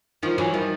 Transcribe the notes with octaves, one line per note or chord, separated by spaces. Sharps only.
D#3 F3
E3 F#3
D#3 F3